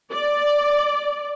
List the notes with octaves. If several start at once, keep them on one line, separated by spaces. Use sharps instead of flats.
D5